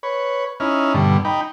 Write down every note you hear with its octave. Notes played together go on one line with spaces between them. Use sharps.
B4 C#5
C#4 D#4 E4 F6
G2 B2 D3 G3
D#4 G5 B5